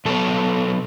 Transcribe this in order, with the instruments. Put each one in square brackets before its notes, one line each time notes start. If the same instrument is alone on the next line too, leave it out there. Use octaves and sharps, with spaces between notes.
[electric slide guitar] B2 F#3 B3 A4